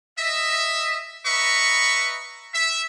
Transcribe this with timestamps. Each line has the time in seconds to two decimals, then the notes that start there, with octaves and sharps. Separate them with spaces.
0.19 D#5 E5
1.26 B4 D#5 E5 A#5 B5 C#6
2.54 E5